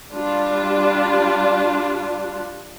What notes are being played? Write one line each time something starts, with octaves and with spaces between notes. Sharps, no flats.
G3 D4 F4